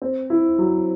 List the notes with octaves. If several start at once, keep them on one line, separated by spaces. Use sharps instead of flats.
C4
E4
F#3